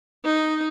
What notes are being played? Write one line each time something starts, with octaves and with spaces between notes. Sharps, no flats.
D#4